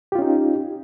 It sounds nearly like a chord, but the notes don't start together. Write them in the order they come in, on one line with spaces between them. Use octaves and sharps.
G4 F4 C#4 D#4